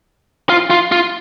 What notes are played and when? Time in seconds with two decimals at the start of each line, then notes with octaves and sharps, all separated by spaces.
0.49 F4
0.70 F4
0.92 F4